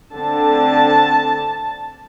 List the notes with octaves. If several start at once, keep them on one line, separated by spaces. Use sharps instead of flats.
D3 A3 C4 A5